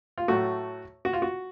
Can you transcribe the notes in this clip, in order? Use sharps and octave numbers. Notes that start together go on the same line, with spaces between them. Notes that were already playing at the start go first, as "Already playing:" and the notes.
F4
A2 F#3 A3 F#4
F#4
F4
F#4